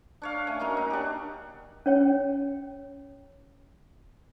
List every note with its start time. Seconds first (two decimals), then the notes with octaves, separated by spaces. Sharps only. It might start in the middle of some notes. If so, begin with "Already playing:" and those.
0.22 D4 C#5 F5
0.47 A3 C#4 G#5
0.60 F#3 A#3 D#4
0.77 D#4
0.90 D4 G4
1.86 C#4 C#5 G5